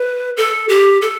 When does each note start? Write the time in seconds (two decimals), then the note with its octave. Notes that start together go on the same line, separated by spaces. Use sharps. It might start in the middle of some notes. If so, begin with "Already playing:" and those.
Already playing: B4
0.37 A4
0.69 G4
1.02 A4